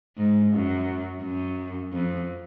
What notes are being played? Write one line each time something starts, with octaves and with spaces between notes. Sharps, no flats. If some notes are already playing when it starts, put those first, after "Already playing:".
G#2
F#2
F#2
F2